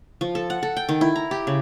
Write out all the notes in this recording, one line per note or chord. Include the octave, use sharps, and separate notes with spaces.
F3
A4
F#5
A4
G5
D#3
E4
A#5
G4
C#3